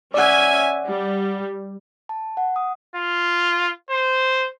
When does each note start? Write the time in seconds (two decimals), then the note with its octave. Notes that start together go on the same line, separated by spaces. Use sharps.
0.14 C#4 D5 E5 F#5 G#5
0.87 G3
2.09 A5
2.37 F#5
2.56 D#6
2.96 F4
3.90 C5